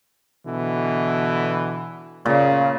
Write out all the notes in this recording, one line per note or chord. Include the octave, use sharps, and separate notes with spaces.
B2 D3 E3
A#2 C#3